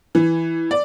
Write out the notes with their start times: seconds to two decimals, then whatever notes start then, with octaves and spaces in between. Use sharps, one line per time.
0.15 E3
0.71 D5